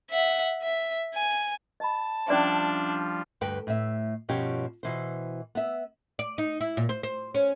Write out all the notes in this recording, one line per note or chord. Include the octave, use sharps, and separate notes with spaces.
E5 F#5
E5
G#5
D#5 A5 B5
F3 G3 C#4 D4 F4 D5 E5
D2 G2 B4 G5
A2 E5
G2 B2 F3 C#4 G4 C#5
B2 E3 C5
B3 E5
D5
D#4
E4
A#2
C5
C5
C#4